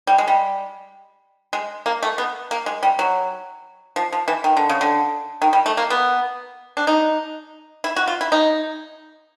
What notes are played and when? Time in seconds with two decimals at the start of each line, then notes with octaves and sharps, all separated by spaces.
0.07 G3
0.18 G#3
0.28 G3
1.53 G#3
1.86 A#3
2.03 A3
2.18 B3
2.51 A#3
2.66 G#3
2.83 G3
2.99 F#3
3.96 F3
4.12 F3
4.28 E3
4.44 D#3
4.57 D3
4.69 C#3
4.81 D3
5.42 D#3
5.53 G3
5.66 A3
5.77 A#3
5.90 B3
6.77 D4
6.87 D#4
7.84 E4
7.96 F#4
8.07 F4
8.21 E4
8.32 D#4